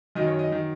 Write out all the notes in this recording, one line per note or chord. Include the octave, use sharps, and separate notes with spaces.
F#2 D#3 F#3 D#5
C#5
D#5
D#3 F#3